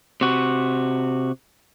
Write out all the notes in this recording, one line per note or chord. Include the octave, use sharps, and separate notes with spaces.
C3 F#4